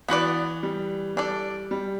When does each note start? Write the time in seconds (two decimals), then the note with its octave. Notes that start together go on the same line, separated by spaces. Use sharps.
0.08 E3 B3 F#4 B4 D5
0.63 G3
1.16 G3 D4 A4 D5
1.71 G3